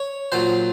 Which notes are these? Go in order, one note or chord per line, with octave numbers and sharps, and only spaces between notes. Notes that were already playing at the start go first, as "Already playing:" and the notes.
Already playing: C#5
A#2 F#3 C5